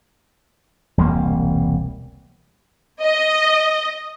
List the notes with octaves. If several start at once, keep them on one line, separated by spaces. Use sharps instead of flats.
E1 C2 G3 A#3
D#5